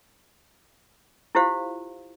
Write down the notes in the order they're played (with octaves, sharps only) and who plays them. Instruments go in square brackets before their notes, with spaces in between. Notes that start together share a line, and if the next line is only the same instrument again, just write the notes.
[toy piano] E4 F4 G4 C5 F5